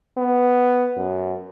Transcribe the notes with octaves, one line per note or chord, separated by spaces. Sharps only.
B3
F#2